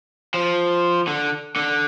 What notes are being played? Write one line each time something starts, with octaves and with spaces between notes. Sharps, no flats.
F3
D3
D3